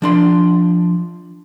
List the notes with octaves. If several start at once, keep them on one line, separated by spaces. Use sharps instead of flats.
F3 D4 C6